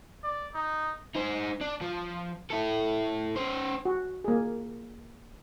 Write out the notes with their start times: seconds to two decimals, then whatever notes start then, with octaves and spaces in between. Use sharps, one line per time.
0.23 D5
0.54 D#4
1.15 D#4 C5
1.61 D4
1.81 F3
2.51 E4 A4
3.37 C#4 C5
3.85 F#4
4.24 A#3 G#4